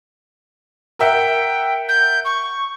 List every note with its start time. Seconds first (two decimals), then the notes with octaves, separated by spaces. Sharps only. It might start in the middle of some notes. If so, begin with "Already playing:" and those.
0.99 A#4 E5 F#5 G5
1.88 G6
2.25 C#6